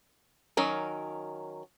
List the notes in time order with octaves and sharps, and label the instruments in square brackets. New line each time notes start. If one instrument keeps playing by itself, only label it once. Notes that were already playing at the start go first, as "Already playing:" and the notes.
[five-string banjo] D#3 F#3 C#4 A#4